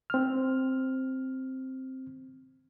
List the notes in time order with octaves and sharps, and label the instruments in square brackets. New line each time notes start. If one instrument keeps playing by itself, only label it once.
[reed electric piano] C4 F6